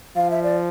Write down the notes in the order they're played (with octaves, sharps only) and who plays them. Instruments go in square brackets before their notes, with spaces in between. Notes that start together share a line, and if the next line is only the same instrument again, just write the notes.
[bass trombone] F3 [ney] F5
[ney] E5
D5